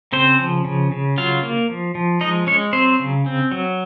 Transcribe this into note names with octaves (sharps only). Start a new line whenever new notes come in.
C#3 C4 C5
F3
C#3
C#3
F#3 F4 F5
A#3
F3
F3
G#3 D#4 D#5
G#3 C#4 C#5
F#3 C4 C5
C#3
C4
F#3